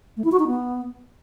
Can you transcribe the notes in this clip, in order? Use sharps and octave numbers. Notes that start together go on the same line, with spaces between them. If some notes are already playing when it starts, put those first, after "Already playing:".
A3
E4
F#4
D#4
B3